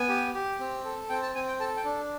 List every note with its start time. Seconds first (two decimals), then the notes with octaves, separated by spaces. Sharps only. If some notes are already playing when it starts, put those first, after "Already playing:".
Already playing: B3 G#5
0.09 G4
0.34 G4
0.60 C4
0.85 A4
1.09 C4 G5
1.23 A5
1.35 C4 G#5
1.48 G5
1.60 A4 A5
1.77 G5
1.85 D4